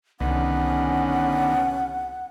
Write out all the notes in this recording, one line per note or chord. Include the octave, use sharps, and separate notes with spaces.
C2 D3 D#3 B3 C#4 F#5